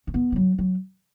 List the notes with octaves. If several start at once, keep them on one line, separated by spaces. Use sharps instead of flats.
C#4
B3
F3
F#3
F#3